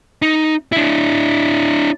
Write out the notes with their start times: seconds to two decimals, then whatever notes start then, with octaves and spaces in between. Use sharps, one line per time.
0.22 D#4
0.72 D4 E4